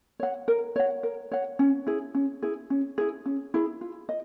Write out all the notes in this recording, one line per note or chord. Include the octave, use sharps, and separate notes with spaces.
C#5 F#5
A#4
C#5 F#5
A#4
C#5 F#5
C#4
E4 G#4
C#4
E4 G#4
C#4
E4 G#4
C#4
E4 G#4
F4
D#5